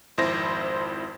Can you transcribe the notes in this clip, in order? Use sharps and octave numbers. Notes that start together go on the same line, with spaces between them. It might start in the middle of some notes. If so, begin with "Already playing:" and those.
G#1 F2 E4 C5 A#6